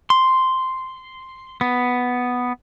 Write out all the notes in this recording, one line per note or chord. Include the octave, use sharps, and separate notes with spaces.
C6
B3